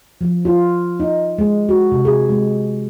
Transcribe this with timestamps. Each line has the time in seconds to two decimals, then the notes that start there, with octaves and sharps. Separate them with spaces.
0.21 F3
0.45 F4
1.00 D#4
1.38 G#3
1.69 F#4
1.92 C3
2.05 G#4
2.29 G#3